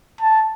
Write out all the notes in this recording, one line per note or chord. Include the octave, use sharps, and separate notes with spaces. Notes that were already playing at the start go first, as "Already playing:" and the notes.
A5